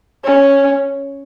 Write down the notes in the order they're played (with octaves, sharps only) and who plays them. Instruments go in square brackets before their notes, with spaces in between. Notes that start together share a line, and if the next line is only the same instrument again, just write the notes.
[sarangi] C#4